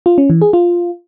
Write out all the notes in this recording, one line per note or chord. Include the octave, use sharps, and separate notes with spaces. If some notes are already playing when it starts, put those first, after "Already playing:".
F4
C#4
E3
G#4
F4